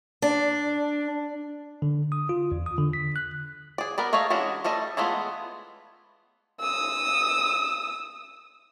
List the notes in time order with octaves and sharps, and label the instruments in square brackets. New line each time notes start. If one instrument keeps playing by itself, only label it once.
[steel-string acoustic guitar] D4
[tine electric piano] D3
D#6
F4
E2
D#6
D3
B6
F#6
[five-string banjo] G#4 D5
B3 A#4 B4 D5
A3 G#4 C#5 D#5 F5
E3 G#3 C#4 D4 F#4
G3 A3 A4 D#5
E3 G#3 A3 B3 F4
[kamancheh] D#6 E6